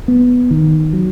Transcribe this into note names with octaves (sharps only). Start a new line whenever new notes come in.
B3
D#3
F#3